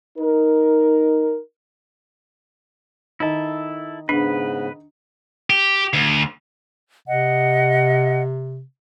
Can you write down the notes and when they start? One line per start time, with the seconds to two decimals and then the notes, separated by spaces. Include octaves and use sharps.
0.19 D#4 A#4
3.20 D#3 E4 A4 D#5 A#5
4.09 G#2 C#3 B3 D4 B4
5.50 G4
5.93 D2
7.08 C3 D#5 F#5